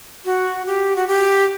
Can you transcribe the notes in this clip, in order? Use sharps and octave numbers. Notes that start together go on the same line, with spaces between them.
F#4
G4
F#4
G4